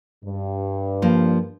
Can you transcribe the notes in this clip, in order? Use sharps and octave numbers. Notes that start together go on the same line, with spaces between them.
G2
F3 A#3